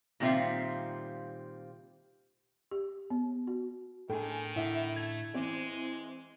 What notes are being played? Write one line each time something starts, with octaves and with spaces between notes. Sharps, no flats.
A#2 D#3 G3 C4 F4 E5
G4
B3
F#4
A2 D#3 D4 G#4 A4 G5 G#5
A2 D3 E4 E5 F#5
A3 G#6 F7
E3 G#3 C4 D5